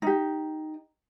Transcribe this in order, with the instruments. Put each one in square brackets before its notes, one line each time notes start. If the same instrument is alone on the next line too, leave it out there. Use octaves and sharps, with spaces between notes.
[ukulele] D#4 G4